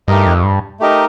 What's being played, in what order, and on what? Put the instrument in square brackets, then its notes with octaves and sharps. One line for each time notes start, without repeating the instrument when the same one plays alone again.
[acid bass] G2 [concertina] A3 D#4 G4 A#4 D#5
[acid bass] F2
G2
[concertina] A3 D#4 G4 A#4 D#5